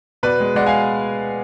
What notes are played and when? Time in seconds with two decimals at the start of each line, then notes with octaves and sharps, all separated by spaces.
0.23 B2 B4 D5
0.40 G#3
0.56 G#3 D5 F#5
0.66 F5 G#5